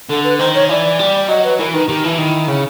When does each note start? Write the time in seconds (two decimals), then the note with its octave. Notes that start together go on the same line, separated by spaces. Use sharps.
0.10 D3 A4
0.24 B4
0.39 D#3 C5
0.55 C#5
0.69 E3 D5
0.99 G3
1.28 F#3 D#5
1.44 B4
1.59 E3 A#4
1.73 D#3 B4
1.88 D#3 G4
2.03 E3 E4
2.19 D#3 E4
2.48 C#3